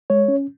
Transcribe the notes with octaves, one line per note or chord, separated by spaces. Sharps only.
G#3 C#5
C#4